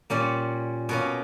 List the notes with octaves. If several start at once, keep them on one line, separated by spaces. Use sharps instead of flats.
A#2 G3 A#3 C#4
B2 A#3 C#4